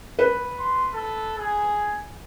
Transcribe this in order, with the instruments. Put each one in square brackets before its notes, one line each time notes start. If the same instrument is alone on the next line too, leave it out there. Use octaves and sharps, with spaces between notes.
[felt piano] B4
[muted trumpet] C6
A4
G#4